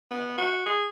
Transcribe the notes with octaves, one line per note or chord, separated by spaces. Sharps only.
B3
F#4
G#4